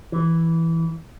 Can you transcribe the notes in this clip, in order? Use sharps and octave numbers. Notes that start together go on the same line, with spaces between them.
E3